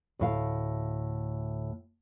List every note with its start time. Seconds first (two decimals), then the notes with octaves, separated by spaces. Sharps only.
0.19 D2 A2 F5